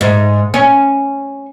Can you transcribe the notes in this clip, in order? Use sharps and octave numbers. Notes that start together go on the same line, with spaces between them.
G#2
C#4